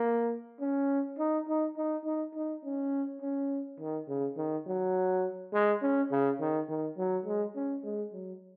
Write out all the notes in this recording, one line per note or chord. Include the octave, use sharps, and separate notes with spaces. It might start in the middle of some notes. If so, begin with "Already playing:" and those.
Already playing: A#3
C#4
D#4
D#4
D#4
D#4
D#4
C#4
C#4
D#3
C#3
D#3
F#3
G#3
C#4
C#3
D#3
D#3
F#3
G#3
C#4
G#3
F#3